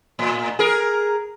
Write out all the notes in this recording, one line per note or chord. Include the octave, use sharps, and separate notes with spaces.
A2
G#4 A#4